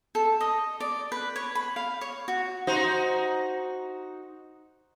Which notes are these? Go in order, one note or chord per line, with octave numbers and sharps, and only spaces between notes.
A4
D#5
D5
B4
C#5
B5
F5
C#5
F#4
D#4 F#4 C5